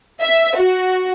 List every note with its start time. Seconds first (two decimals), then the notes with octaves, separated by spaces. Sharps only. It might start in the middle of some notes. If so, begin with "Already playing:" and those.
0.22 E5
0.57 F#4